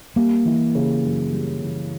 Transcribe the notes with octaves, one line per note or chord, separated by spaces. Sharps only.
G3 A#3
E3
C#3
F#2
G3
E3